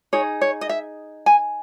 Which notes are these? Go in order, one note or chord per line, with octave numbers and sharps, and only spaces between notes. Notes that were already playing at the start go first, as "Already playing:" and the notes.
D#4 G#4 C#5
C#5
D#5
E5
G#5